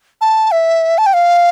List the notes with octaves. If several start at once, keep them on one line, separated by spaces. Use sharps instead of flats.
A5
E5
A5
G5
F5